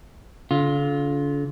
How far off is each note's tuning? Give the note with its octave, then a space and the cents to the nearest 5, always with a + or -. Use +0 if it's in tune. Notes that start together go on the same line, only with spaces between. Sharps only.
D3 -40 F4 +10